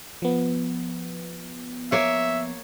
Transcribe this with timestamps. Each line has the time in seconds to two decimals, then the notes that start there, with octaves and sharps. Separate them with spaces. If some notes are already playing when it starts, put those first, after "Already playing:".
0.22 F3 B3
1.92 A#3 C#5 E5